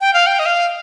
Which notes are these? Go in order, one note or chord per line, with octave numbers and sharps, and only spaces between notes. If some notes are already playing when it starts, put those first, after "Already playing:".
G5
F5
G5
D#5
F5